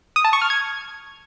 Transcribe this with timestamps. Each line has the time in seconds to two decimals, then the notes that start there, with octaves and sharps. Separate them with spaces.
0.16 D#6
0.24 A5
0.33 C#6
0.42 F6
0.50 G#6